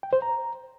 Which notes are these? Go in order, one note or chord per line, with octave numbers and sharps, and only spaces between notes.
G5
C5
A#5